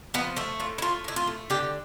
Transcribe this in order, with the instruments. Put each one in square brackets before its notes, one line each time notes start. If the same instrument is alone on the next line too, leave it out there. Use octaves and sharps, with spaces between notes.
[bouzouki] F3 B3
A3 E4
A2 F4
E4
A3 F4
A2 E4
F4
A3
D3 G4